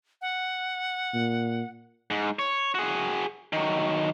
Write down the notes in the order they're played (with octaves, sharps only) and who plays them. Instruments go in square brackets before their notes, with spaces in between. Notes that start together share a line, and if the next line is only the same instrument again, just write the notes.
[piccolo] F#5
[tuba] A#2
[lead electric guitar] G#2
C#5
F#4 G#4
D#3 F#3